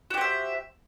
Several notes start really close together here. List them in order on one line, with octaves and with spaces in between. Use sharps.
F#4 G4 C5 E5